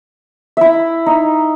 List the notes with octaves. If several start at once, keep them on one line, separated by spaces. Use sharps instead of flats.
E4 E5
D#4